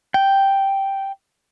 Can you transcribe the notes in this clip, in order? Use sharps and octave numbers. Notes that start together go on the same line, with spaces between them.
G5